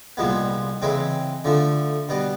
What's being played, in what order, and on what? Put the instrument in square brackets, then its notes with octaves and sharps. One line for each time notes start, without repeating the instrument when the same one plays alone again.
[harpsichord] C2 A#2 F3 G#3 B3
C#3 E3 G#3 C4
D3 F3 A3
B2 G3 B3